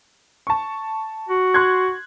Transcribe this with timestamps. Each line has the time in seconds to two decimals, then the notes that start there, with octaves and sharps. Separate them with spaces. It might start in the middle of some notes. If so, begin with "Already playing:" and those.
0.47 A5 C#6
1.29 F#4
1.54 C6 F#6 G#6